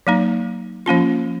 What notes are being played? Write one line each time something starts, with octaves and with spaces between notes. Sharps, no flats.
F#3 A#3 D#4
F3 A#3 C#4 F4